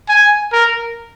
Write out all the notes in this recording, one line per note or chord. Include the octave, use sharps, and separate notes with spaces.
G#5
A#4